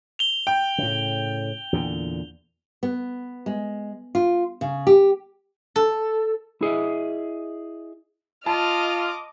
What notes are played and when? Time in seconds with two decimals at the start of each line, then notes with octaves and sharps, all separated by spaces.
0.19 F7 G7
0.47 G5
0.78 A2 C#3
1.73 E2 A#2 D3
2.83 B3
3.46 G#3
4.15 F4
4.61 C#3
4.87 G4
5.76 A4
6.61 E4 G#4 D#5 E5
8.46 F4 D#5 A5 D6 F6